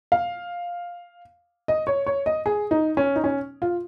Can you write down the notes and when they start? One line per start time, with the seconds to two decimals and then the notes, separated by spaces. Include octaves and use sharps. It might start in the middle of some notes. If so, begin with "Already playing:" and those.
0.12 F5
1.68 D#5
1.87 C#5
2.06 C#5
2.26 D#5
2.46 G#4
2.71 D#4
2.97 C#4
3.16 D#4
3.24 C#4
3.62 F4